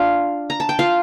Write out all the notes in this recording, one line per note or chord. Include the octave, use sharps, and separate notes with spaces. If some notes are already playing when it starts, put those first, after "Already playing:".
Already playing: D4 F4 F5
A#5
A5
G5
F4 F5